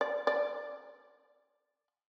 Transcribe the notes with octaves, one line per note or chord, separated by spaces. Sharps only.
D5
D5